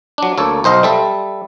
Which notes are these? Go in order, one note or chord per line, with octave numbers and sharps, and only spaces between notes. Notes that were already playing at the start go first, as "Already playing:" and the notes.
F#3 D4
D2 A#3 A4 C#5
B1 C5 D#5 F5
G3 A4 E5